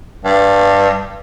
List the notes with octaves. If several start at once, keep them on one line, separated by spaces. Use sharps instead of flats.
G2